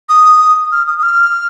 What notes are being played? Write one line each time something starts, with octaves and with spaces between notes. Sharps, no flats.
D#6
F6
D#6
D#6
F6